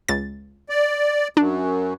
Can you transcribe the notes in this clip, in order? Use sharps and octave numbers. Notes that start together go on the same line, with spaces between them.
C#2 A6
D5
F#2 D4